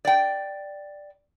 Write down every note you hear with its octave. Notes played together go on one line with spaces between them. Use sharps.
D5 G5